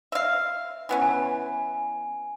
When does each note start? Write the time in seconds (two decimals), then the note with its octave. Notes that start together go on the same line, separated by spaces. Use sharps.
0.12 E5 F5
0.89 E3 B3 C#4
1.02 G#5